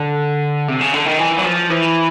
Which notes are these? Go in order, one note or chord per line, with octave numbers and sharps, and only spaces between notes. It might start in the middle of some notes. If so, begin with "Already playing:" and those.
Already playing: D3
C3
C#3
D3
D#3
E3
F#3
F3
E3